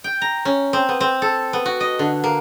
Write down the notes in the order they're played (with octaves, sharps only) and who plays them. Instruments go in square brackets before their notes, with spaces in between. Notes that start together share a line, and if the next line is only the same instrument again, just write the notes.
[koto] G5
A#5
C#4
C4
B3
C4
A4
B3
F#4
D#5
D3
A#3